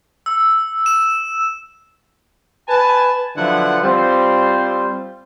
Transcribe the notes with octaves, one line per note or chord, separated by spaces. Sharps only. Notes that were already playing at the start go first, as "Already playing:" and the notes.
E6
E7
B4 G#5 A5
D3 F3 F#3 E4 B4 F#5
G3 C4 F4 C5